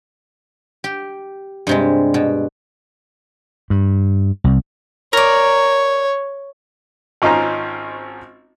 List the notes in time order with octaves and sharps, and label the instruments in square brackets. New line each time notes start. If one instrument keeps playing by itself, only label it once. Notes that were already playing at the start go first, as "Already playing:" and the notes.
[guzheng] G4
G2 C3 G#3
B2
[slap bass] G2
C2
[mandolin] A#4 D5 [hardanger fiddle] C#5
[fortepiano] G#1 C#4 D#4 F4 C5 A#5